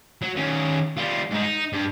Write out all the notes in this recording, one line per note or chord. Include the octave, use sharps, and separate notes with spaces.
F#3
D#3 C#4
G3 F4
G#2 D#4
D#4
G2